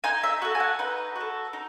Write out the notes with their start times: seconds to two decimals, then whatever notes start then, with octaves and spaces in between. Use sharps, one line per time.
0.04 D#4 G#5
0.24 E5
0.42 F#4 A4
0.55 G#5
0.60 F#5
0.79 D#4 B4
1.16 F#4 A4
1.53 D#4